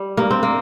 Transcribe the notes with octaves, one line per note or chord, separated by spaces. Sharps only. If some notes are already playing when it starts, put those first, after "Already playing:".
Already playing: G3
G2 A#3
C4
A#3